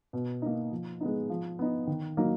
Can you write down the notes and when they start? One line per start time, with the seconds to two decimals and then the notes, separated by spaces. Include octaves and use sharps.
0.13 B2
0.42 A#3 D#4
0.71 F3
1.01 G#3 B3 D#4
1.30 F3
1.59 B3 D#4
1.87 D#3
2.17 F#3 A#3 D#4